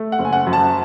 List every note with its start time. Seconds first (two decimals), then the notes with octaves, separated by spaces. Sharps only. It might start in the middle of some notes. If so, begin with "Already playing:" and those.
Already playing: A3
0.12 F#5
0.19 F#1
0.25 G#5
0.33 F#5
0.47 F#2
0.53 A5